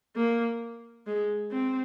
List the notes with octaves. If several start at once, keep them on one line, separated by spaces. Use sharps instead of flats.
A#3
G#3
C4